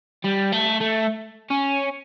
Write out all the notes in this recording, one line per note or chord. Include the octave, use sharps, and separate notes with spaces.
G3
A3
A3
C#4